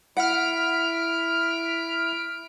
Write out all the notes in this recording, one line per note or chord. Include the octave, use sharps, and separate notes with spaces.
E4 F#5 F6 B6 D7